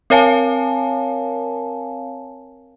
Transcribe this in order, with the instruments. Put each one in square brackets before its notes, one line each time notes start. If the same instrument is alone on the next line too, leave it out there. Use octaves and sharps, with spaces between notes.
[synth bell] C4 A#4 C#5 F5 G#5 A5